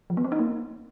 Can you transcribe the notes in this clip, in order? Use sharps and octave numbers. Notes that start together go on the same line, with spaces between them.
F3
B3
C4
D#4
A#3